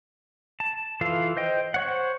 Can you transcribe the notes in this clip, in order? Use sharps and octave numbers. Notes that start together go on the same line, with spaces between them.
A5
E3 F4 A4 F5
C5 D#5 G5
C5 C#5 F#5